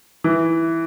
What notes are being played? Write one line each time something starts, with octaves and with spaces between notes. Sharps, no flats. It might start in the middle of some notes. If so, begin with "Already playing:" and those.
E3